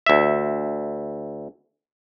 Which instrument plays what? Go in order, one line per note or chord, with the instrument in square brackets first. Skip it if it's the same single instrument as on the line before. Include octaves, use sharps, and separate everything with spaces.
[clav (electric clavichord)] D2 E5